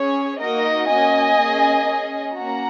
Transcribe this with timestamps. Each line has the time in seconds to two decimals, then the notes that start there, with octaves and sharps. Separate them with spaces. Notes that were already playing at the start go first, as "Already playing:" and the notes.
Already playing: C#4 G#4 C#5
0.40 A#3 D#4 F#4 A#4 D#5
0.89 A#3 C#4 F#4 D#5 G#5
1.38 A#3 C#4 G#4
1.87 C#4 G#4
2.35 A#3 C#4 F#4 F#5 A#5